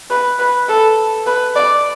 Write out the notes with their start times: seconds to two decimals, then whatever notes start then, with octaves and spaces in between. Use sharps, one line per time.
0.10 B4
0.39 B4
0.68 A4
1.26 B4
1.55 D5